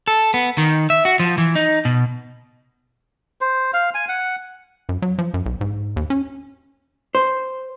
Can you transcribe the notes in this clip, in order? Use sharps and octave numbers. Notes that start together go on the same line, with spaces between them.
A4
B3
D#3
E5
F#4
F3
E3
D#4
B2
C5
F5
G#5
F#5
F#2
F#3
F3
F#2
B1
G#2
D#2
C#4
C5